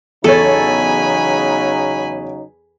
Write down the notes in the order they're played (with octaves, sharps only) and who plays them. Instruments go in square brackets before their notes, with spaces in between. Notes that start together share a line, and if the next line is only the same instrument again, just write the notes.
[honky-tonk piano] E2 C#5 [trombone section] C#3 F#3 D#4 [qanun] A4 [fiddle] G#5 B5